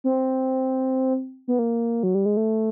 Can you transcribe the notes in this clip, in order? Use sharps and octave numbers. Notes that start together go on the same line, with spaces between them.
C4
B3
A#3
F#3
G3
G#3
A3